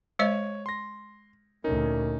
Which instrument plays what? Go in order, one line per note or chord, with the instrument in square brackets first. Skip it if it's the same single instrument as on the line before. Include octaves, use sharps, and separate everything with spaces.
[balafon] G#3 C5 D#5 [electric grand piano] C#5
[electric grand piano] C6 A#6
[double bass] D2 A#2 [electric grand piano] C#4 D#4 [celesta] A#4